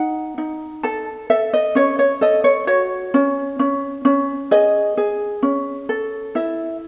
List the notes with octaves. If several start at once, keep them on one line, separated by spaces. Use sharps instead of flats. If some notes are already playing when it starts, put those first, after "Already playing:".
Already playing: D#4 F#5
D#4
A4 A5
A4 E5
D#5
C#4 C#5
C#5
A4 D#5
C#5
F#4 C#5
C#4
C#4
C#4
G#4 D#5
G#4
C#4
A4
E4 E5